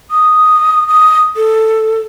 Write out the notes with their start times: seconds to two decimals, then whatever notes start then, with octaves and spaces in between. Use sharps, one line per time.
0.11 D#6
0.88 D#6
1.36 A4